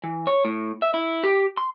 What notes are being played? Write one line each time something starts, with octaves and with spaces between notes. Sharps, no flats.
E3
C#5
A2
E5
E4
G4
C6